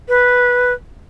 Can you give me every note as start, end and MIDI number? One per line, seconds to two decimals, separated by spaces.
0.08 0.72 71